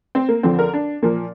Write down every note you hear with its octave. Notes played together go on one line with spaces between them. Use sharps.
C4
A#3
F2 D3 F3 C4
A#4
D4
A#2 F3 A#3